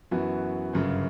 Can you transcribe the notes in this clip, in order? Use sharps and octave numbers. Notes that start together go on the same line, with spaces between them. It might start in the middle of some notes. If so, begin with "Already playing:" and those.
F#2 E3 B3 F#4
G1 F#2 C#3